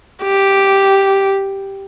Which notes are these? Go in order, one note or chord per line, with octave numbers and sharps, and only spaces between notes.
G4